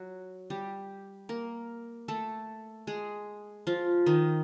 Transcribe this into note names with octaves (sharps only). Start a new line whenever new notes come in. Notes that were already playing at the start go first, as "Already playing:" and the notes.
Already playing: F#3 F#4
G3 G4
A#3 A#4
A3 A4
G#3 G#4
F3 F4
D#3 D#4